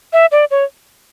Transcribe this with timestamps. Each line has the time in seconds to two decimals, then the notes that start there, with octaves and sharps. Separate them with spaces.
0.13 E5
0.32 D5
0.51 C#5